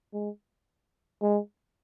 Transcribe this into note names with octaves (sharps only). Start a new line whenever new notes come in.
G#3
G#3